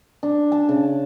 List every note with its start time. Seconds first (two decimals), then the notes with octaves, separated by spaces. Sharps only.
0.23 D4
0.52 A5
0.69 C#3